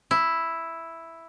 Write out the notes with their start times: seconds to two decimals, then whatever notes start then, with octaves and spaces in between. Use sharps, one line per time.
0.11 E4